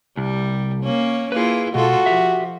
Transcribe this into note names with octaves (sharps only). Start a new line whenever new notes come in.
C2 G3
A#3 C#4
A#3 E4 F4 G#4 B4
B2 G#3 F4 F#4 A4
F3 G4 E5